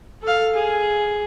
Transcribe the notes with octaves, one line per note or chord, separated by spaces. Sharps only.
A4 F5
G#4